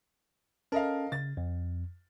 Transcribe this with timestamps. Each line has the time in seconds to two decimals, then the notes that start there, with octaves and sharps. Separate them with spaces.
0.72 C#4 A4 A#4 D#5 F5 A5
1.12 C#3 A6
1.37 F2